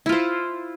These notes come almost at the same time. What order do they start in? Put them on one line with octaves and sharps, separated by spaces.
E4 F4 C5